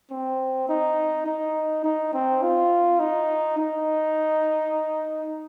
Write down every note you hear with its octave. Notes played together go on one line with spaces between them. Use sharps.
C4
D#4
D#4
D#4
C4
F4
D#4
D#4